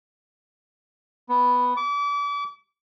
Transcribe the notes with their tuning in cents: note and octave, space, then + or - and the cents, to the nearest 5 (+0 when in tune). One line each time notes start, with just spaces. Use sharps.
B3 +0
D6 -35